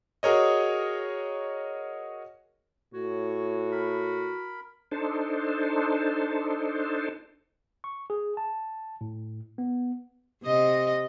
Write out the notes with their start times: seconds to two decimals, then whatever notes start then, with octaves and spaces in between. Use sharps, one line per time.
0.23 F#4 G#4 A#4 C#5 D#5
2.94 A2 F#4 C#5
3.71 A#4 B5
4.92 D4 D#4 A4 C5
7.84 C#6
8.10 G#4
8.37 A5
9.01 A2
9.58 B3
10.44 C3 D#5